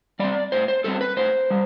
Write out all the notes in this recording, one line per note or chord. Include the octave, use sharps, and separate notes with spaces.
G3 C4 D5
A2 C5
C5
G3 C4 A4
B4
A2 C5
G3